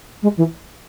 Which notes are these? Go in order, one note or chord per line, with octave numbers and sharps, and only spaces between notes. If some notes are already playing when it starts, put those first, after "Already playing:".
G#3
E3